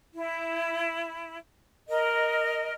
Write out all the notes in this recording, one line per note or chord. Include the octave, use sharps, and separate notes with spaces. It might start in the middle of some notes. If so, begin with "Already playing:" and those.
E4
A#4 D#5